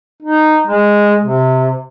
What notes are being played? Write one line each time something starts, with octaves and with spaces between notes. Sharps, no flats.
D#4
G#3
C3